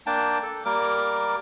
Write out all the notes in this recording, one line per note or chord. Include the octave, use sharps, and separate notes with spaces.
A#3 D4 G5 A5
A4
G3 A#3 A#4 D6